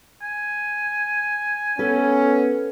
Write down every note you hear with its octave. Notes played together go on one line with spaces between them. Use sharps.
G#5
B3 C#4 A4 B4